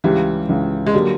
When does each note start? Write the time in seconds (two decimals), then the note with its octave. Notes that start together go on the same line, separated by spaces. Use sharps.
0.04 C#2 C#3 E3 G3
0.49 C#2 C#3 E3
0.86 G#3
0.94 D3 F#3 G3 A#3